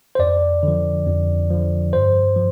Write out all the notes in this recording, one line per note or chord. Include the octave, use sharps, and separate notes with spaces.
C5
F2 D5
D3 F3
F2
D3 F3
G2 C5
F3